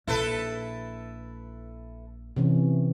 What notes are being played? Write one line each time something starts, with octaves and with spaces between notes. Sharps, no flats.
A#1 E4 A4 B4
C3 E3 C#4